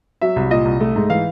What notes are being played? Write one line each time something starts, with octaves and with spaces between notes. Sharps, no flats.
F#3 E5
C2
A#2 D#5
C2
A3
G#2
E3 F5